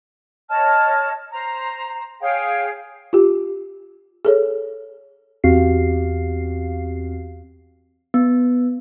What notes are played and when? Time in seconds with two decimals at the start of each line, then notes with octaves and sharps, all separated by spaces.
0.49 C#5 D#5 A5 F6
1.31 C5 A#5
2.20 G#4 C#5 F5 G5
3.13 F4 G4
4.25 G#4 A4 C#5
5.44 E2 C4 F#4 G4 F5 C7
8.14 B3